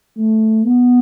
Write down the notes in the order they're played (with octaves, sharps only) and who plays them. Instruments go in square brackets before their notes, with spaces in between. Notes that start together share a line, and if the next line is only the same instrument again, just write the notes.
[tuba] A3
B3